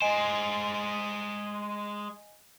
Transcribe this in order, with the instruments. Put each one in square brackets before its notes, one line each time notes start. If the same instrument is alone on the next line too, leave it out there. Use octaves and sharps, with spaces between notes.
[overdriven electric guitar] G#3 C5 [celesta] D#5 G#5 D7